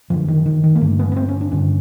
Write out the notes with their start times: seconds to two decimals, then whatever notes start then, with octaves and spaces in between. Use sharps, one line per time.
0.10 F#2 D3 F3
0.28 D#3
0.46 D#3
0.64 D#3
0.75 A#3
0.81 G2 D3 A3
0.99 B3
1.12 B3
1.16 C4
1.29 C#4
1.41 D4
1.52 G2 D3 C#4